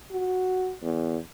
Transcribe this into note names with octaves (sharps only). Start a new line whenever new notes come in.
F#4
E2